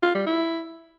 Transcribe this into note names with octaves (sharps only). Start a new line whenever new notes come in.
F4
G3
E4